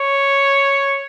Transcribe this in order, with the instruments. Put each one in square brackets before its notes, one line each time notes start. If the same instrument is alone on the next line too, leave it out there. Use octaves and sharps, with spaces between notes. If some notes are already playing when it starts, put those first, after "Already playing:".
Already playing: [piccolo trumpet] C#5